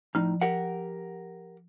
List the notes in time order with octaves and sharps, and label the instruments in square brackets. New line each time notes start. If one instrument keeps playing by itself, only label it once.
[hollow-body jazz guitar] A2 D#4 [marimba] F3
[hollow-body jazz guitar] G4 A#4 F#5